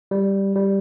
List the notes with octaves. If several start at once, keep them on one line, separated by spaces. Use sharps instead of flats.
G3
G3